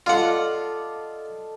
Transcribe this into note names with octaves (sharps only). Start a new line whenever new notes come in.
F4 A4 D5 D#5 F#5